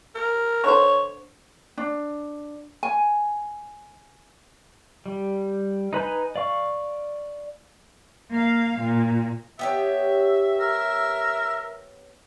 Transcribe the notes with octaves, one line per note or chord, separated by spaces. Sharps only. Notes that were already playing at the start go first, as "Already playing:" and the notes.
A#4
D3 C5 C#5
D4
G#5
G3
D#4 B4 G#5 G6
D5 F5 C#6
A#3 F5
A#2
B3 G4 C#5 E5
A#4 E6